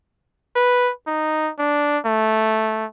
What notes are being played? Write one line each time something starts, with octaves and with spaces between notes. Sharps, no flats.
B4
D#4
D4
A3